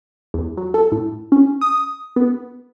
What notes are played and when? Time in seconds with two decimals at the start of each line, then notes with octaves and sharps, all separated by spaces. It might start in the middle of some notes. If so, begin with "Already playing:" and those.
0.34 E2
0.57 F#3
0.74 A4
0.92 A2
1.32 C#4
1.61 D#6
2.16 B3